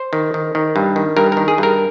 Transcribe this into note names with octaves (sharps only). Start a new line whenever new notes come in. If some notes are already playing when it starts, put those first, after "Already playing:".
Already playing: C5
D#3
D#3
D#3
G2
D#3
G2 A#4
D#3 A#4
G#4
G2 A#4